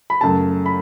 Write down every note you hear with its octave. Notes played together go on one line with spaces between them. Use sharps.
B5
F#2 C#3 F#3 A3 A5
B5